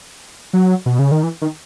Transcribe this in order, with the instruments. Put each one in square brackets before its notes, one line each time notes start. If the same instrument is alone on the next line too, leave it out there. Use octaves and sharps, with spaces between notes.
[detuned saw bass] F#3
B2
C#3
D#3
E3
D#3